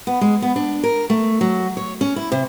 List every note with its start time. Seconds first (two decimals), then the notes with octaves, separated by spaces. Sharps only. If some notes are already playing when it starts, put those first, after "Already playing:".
0.07 B3
0.21 G#3
0.42 B3
0.56 D4
0.83 A#4
1.10 A3
1.41 F#3
1.77 C#5
2.01 C#4
2.16 E4
2.32 C3